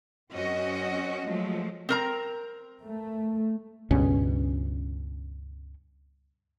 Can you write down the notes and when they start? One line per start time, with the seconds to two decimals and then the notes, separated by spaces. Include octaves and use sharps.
0.33 F#2 C4 C#4 F#4 D#5
1.27 F3 F#3 G#3 A3
1.89 C4 A#4 A#5
2.85 A3
3.91 C#2 G2 B2 C#4